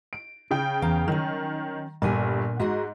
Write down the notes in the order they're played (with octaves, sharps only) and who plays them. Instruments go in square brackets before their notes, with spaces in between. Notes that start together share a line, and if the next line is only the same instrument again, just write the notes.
[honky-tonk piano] D7
C#3 G5
[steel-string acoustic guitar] E2 F5 A#5
[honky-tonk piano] D#3 [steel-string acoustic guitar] F#3 C#4
[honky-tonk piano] G1 G2 [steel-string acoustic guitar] A#2 D4 G#5
[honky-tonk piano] G#2 [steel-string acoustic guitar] F#4 G#4 D#5